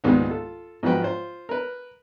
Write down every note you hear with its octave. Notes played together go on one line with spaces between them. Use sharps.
C#2 G#2 D#3 G3 A#3 B3
F4 A4
G#2 F3 F#3 F#4 B4 G5
F4 C5
A#4 B4